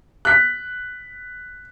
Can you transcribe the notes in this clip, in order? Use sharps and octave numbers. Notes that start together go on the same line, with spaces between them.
F#6 B6